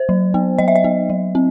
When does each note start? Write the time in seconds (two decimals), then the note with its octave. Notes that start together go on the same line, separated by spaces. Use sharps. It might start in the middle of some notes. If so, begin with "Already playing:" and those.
Already playing: C5
0.09 F#3
0.34 B3
0.58 F#3 D#5
0.68 E5
0.76 D#5
0.84 B3
1.10 F#3
1.35 C4